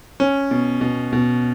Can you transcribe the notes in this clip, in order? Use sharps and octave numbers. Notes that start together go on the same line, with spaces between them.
C#4
B2
B2
B2